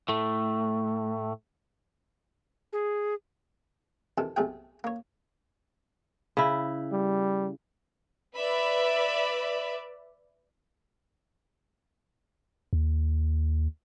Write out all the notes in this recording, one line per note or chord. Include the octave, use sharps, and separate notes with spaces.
A2 A3
G#4
C3 D#3 E3 A4
B1 C3 A3 G#4 G5
A#3 C#5
C#3 E4
G3
B4 D5 E5 B5
D#2